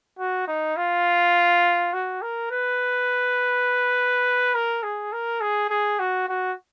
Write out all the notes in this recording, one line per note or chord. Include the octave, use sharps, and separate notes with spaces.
F#4
D#4
F4
F#4
A#4
B4
A#4
G#4
A#4
G#4
G#4
F#4
F#4